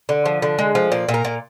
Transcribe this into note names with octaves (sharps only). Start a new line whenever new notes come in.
D3
F3
D3
G#3
F3
A#2 D5
A#2
A#4
A#2